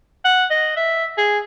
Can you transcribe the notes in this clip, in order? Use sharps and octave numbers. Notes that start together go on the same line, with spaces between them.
F#5
D#5
E5
G#4